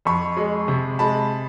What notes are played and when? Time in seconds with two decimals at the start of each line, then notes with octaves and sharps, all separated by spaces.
0.05 F2 B5 C#6
0.37 G#3
0.68 C3
0.99 G#3 A5 B5